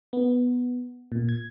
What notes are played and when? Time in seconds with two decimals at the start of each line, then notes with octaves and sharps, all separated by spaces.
0.13 B3
1.12 A#2
1.29 G#6